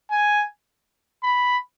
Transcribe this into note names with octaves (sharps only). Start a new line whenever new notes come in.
G#5
B5